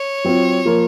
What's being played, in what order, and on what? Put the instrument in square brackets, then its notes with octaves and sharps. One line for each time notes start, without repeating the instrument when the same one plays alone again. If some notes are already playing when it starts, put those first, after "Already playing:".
Already playing: [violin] C#5
[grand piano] F#3 C4 F4
F3 A#3 F4